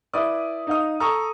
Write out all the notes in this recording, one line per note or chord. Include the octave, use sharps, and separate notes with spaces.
E4 B4 D5 D#6
D#4 F5 D#6
A4 A#5 C#6 D#6